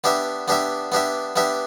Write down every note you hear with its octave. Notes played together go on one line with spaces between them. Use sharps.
B3 D4 G4 E5
B3 D4 G4 E5
B3 D4 G4 E5
B3 D4 G4 E5